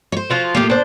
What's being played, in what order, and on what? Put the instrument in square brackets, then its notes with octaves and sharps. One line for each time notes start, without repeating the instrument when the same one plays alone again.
[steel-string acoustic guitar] C5 C#5
[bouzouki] F3 F4 F#4
[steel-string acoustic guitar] A2 A#3 [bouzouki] F4 G4
[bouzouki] D4 C5